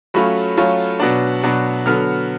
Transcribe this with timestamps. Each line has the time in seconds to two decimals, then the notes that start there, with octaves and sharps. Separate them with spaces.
0.14 F#3 A3 C#4 F4 B5
0.57 F#3 A3 C#4 F4
1.00 B2 F#3 B3 D4
1.43 B2 F#3 B3 D4
1.86 D3 F#3 B3 F6